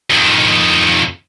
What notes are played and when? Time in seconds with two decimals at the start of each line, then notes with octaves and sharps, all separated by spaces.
0.10 F2 D#3